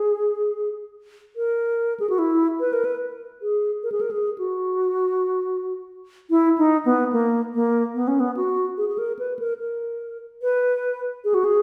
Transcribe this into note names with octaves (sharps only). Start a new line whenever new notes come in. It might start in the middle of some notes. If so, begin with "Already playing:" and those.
Already playing: G#4
A#4
G#4
F#4
E4
B4
A#4
B4
G#4
A#4
G#4
A#4
G#4
F#4
E4
D#4
B3
A#3
A#3
B3
C#4
B3
F#4
G#4
G#4
A#4
B4
A#4
A#4
B4
G#4
F#4
G#4